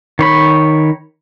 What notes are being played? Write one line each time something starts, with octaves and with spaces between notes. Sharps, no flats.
D#3 C#5 B5